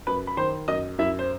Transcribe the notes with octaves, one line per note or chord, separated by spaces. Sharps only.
F#2 B4 B5
B5
D#3 C5 C6
F#2 D#5 D#6
F#2 E4 E5
C5